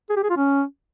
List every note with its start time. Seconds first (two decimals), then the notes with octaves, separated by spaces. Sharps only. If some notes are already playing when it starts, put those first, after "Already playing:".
0.10 G#4
0.17 G4
0.23 G#4
0.30 F4
0.37 C#4